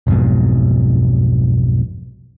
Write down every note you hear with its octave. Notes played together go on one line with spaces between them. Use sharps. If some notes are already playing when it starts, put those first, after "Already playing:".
B1 F2 G#2 B2